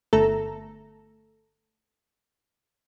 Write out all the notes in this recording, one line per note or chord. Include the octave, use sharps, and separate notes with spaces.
G1 A3 A4 A#5